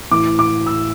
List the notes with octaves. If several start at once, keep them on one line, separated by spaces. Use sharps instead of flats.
A2 E3 D6
D6
E6